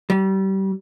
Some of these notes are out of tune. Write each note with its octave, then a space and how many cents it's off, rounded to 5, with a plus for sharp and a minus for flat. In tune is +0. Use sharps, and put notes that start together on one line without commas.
G3 -30